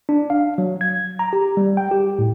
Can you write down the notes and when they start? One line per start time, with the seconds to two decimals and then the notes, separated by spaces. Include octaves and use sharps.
0.09 D4
0.30 F5
0.58 F#3
0.81 G#6
1.19 A#5
1.33 G4
1.57 G3
1.77 G5
1.91 G4
2.19 A2